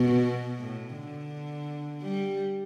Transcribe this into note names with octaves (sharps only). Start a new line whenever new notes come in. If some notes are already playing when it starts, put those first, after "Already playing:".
Already playing: B2
A2
D3
G3